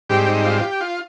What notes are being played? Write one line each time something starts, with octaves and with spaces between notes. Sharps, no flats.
G#2 G3 C4 G4
D#4
F4
F4
G4
F4